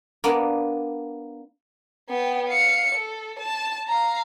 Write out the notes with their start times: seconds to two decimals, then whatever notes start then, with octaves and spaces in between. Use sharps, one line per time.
0.24 A#3 B3 D4
2.09 B3 G5
2.48 F5 C#7
2.95 A4
3.39 A5
3.88 F5 A#5